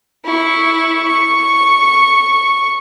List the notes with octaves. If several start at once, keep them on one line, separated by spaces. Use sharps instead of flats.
E4 C#6
C#6